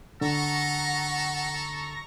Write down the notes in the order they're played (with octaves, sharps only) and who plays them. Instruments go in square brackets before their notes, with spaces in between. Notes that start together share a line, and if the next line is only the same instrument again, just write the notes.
[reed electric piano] D3 [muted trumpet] A4 [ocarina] F#5 [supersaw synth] A#5 C#6 A#6